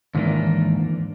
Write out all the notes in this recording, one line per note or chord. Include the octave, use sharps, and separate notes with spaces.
D#2 G#2 E3 A#3 D4